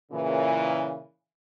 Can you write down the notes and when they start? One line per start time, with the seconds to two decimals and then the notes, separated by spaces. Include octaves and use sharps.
0.12 A#2 C#3 E3